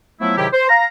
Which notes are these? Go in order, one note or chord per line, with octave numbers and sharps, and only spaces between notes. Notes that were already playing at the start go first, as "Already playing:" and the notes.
F3 F#3 A3 B3 E4
G#2 C3 D#3 F#3 E4 G4
C5
F5 A#5